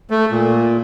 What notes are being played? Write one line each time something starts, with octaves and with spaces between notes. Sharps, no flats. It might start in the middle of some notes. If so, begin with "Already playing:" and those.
A3
A#2